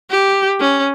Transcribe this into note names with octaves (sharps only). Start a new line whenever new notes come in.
G4
C#4